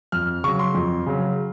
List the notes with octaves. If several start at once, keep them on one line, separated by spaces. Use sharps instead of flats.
F2 F6
C#3 F#3 C#6
C6
F2
C#3 F#3